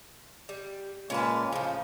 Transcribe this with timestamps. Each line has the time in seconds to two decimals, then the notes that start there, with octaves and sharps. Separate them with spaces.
0.49 G3
1.10 A#2 G#3 A#3 C#4 B4 A5
1.52 A2 C#3 F3